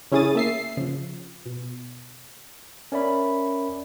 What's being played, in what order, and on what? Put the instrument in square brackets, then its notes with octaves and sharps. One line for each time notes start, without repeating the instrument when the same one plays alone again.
[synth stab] C#3 C#4 E4 G#4 D#6 A6
A#3 E5 C7
C#3 F3
B2
[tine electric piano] C#4 A#4 D5 E5 B5